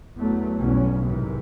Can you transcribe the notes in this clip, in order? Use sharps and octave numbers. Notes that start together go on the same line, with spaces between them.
E2 F#3 A3
B1 E2 G2 C#4
G#2 C3 D#3 E3